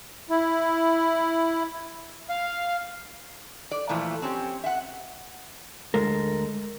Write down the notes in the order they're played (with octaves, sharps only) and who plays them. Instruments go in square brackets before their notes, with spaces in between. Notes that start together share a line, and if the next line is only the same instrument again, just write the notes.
[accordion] E4
F5
[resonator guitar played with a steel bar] D5
A#2 E3 F3 A3
C4 C#4 G4
E5 F#5
[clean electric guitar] D2 G#3 A4 A#4